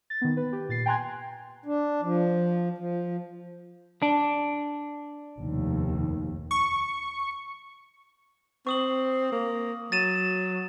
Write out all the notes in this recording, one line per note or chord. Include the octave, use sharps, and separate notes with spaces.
A6
D#3 B3
B4
G4
A#2 A6 C7
G5 G#5 A#5 C6 F#6 G#6
D4
F3
F3
D4
F1 D#2 B2
C#6
C4 C#6 D#6 F#7
A#3
F#3 A6 D#7 E7